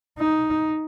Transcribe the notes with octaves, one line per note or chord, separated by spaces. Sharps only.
D#4